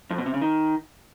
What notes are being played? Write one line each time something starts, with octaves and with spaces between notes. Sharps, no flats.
F2
B2
C3
C#3
D#3